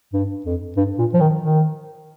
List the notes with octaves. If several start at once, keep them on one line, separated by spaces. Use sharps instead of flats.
G2
F2
G2
A#2
F3
D#3
D#3